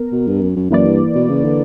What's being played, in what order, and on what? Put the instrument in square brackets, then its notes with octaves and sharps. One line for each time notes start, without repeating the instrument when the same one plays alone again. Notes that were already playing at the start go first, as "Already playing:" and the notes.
Already playing: [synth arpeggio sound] B3 A#4
[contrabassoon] B2
G2
F#2
F#2
[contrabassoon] F#2 [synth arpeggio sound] E3 A#3 E4 B4 D5
[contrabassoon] G2
B2
C#3
D3